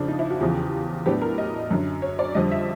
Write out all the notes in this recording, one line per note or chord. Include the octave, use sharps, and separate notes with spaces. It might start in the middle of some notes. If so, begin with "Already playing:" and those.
Already playing: F2 C#3 F3 D4
D#4
E4
F#4
E2 C#3 F3 G4
A2 F#3 B3 D4 G4
A#4
D#5
F#2 D3 F#3
C#5
D5
F2 D3 G3 D#5
E5